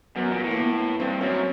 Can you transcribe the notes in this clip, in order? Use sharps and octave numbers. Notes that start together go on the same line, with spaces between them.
F#2 B3
A#2
A2
A#3
B3
G2 C4
F#2 C#4